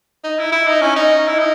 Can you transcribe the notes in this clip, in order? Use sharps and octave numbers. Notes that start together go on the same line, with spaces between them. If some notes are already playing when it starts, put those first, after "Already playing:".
D#4
E4
E4
D#4
C#4
D#4
E4
D#4